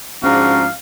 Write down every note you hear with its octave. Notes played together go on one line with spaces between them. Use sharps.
G#2 F3 C#4 D4 F#4 F5 A#5